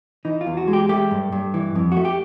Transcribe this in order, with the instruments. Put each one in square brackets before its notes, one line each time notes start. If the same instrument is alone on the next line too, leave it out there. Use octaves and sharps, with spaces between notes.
[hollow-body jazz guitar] E3 D#4
F4
E2
F#4
G#3
G4
A3 G4
G2
G2
E3
F2
A3 F#4
G4